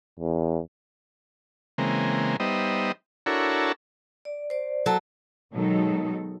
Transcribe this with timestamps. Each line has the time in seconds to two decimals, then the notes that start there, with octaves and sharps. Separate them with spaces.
0.20 E2
1.78 C#3 E3 G#3 A#3 C4
2.40 G3 B3 D#4 C5 D#5 E5
3.26 D4 E4 F#4 A4 A#4 C#5
4.25 D5
4.50 C5 D5
4.86 F#3 A4
5.54 B2 D#3 F#3 G#3 D#4 A4